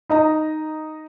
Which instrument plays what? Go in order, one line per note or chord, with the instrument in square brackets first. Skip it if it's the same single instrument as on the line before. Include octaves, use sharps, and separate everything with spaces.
[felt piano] D#4 D#5 A#5